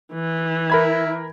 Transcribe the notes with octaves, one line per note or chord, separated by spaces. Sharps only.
E3
E4 A#4 B5 G#6